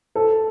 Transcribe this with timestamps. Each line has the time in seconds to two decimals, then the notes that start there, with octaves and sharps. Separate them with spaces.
0.15 A4